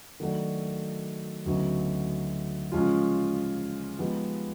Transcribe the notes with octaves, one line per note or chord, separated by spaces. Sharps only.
D#3 F#3 A3 D4 F#4
D2 C#3 F#3 B3 D#4
C#3 F3 G#3 C#4 F4
F3 G#3 B3 D#4 G4